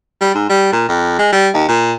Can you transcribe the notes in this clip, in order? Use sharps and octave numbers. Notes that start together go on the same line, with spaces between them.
G3
G#2
G3
A#2
F2
G#3
G3
D#2
A#2